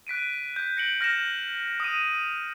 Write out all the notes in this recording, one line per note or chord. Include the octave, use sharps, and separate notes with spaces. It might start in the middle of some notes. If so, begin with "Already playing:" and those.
F#6 B6 D7 D#7
G6 B6
A#6 C#7 D7 F#7
F6 A#6 C#7 E7
D#6 D#7